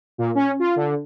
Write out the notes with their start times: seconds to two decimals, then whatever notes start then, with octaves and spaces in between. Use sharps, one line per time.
0.18 A#2
0.35 C#4
0.59 F4
0.76 D3